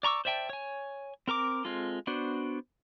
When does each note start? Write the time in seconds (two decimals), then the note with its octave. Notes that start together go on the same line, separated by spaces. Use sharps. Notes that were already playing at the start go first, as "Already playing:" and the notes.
0.03 D5 A#5 C#6 D6 E6
0.25 C5 D5 E5 G5 A5
0.50 C#5 G#5
1.28 C4 A#4 A#5 D6
1.65 G#3 C4 F4 A4
2.07 B3 D4 F#4 C5